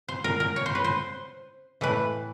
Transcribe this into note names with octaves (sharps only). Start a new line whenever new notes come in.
C5
A#4
A#4
C#5
C5
B4
C5
A2 E3 A3 B4